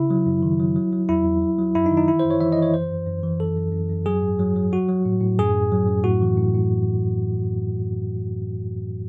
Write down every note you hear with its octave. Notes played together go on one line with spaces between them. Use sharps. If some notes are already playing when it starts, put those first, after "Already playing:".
Already playing: C#3 E4
F#3
F#2
D#3
F#3
F#3
F#3
E2 E4
E2
F#3
F#3
F#2 E4
D#4
D#3
D#4
E3 E4
C5
F#2
C#5
E3 E5
E3 D#5
C#5
F#2 C5
F#2
F#2
E3
F#2 A4
F#2
F#2
F#2
F#3 G#4
G#2
F#3
F#3
F#3 F#4
F#3
A2
A2
F#2 G#4
F#2
F#3
F#2
A2 F#4
E3
A2
A2